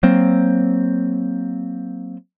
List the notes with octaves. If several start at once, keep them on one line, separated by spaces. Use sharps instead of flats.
F#3 A#3 C4